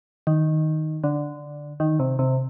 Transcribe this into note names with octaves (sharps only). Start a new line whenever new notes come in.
D#3
D3
D#3
C3
C3